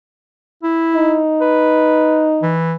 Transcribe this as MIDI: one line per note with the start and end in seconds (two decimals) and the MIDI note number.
0.63 1.20 64
0.96 2.56 63
1.41 2.31 71
2.42 2.76 52